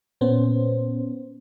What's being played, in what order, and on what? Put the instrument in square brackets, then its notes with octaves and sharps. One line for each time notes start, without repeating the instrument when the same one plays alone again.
[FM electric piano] A#2 B3 C#4 C5